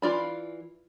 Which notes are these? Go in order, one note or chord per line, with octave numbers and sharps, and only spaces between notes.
E3 F4 D5 B5